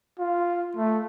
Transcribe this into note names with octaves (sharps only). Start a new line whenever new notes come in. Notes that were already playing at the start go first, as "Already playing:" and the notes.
F4
A3